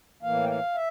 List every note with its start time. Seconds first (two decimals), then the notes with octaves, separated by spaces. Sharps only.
0.22 A2 E3 A#3 F5
0.44 G5
0.49 F5
0.75 E5